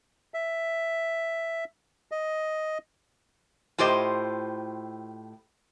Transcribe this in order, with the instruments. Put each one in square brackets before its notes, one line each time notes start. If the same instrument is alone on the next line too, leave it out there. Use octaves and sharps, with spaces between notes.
[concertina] E5
D#5
[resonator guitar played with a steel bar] A2 F4 G4 C5 D#5